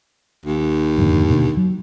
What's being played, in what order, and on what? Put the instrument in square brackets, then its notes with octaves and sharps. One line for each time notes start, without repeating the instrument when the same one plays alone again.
[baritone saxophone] D#2
[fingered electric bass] F2 G#2 D3
B2 D3
F#3